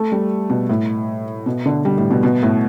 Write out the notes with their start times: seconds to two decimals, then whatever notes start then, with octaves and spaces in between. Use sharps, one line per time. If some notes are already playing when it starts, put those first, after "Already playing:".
Already playing: A3
0.12 G3
0.49 B2
0.69 A2
1.46 B2
1.66 D3
1.85 G3
1.98 A2
2.11 B2
2.23 B2
2.43 A2